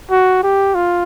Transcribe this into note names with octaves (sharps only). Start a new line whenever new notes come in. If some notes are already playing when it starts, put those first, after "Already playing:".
F#4
G4
F4